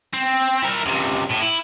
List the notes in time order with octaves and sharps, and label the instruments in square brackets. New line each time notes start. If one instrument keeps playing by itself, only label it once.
[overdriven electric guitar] C4
E4 A#4
C#2 C3
A2
E4